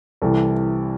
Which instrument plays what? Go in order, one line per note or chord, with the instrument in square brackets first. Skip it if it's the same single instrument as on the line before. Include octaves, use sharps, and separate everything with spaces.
[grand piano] C2 C3 E3 A4